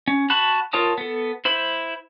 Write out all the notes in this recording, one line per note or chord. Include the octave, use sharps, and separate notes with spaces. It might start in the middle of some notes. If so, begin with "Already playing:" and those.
C#4
F#4 A5 B5 F#6
F4 A#4 C#5 A5 D#6
B3 A4
E4 C5 B5